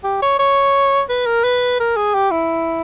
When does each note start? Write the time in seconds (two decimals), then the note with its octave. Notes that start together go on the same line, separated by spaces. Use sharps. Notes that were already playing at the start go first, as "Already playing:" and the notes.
0.04 G4
0.22 C#5
0.39 C#5
1.09 B4
1.26 A#4
1.44 B4
1.79 A#4
1.96 G#4
2.14 G4
2.31 E4